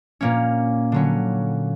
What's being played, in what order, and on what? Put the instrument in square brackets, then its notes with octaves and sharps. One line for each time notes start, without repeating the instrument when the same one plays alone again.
[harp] A#2 A#3 C#4
D3 F#3 C#4